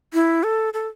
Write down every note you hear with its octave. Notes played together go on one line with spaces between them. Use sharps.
E4
A4
A4